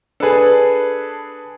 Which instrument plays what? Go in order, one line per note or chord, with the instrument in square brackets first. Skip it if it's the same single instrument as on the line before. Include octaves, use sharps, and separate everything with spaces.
[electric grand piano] D4 G#4 [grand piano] A4 B4